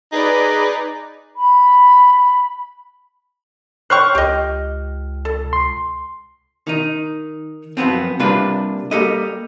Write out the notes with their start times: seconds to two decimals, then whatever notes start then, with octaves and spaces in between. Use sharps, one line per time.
0.12 D#4 G#4 B4 D5
1.36 B5
3.90 C5 C#5 G5 C#6 F6 F#6
4.15 C#2 G4 D#5
5.25 A4
5.53 C6
6.67 D#3 D#4
7.77 F#2 F3 A3 B3 C4
8.19 C3 G3 A#3 D4 F4 B4
8.91 G3 A#3 G4 A4 B4 D#5